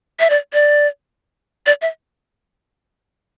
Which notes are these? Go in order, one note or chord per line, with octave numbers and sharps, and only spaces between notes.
E5
D5
D5
D5
E5